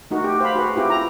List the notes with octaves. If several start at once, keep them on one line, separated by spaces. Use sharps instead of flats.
A3 D#4 F#4 A#4
G4
C5 F5 B5
F#4 G#4 B4
C4 E4 F4 G4
E4 A#5